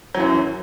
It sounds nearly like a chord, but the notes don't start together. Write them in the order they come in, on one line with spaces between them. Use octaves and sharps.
F#3 E3 F#2